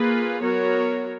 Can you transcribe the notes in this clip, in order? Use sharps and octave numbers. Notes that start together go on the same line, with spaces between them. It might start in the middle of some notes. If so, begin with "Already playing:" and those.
Already playing: A#3 F4 G#4 B4
F#3 B3 F#4 A#4 C#5